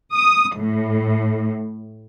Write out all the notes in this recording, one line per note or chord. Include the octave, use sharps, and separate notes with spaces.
D#6
A2